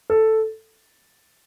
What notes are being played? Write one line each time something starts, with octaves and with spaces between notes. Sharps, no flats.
A4